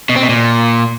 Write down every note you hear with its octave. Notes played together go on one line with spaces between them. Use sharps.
B2
C4
B2
A#2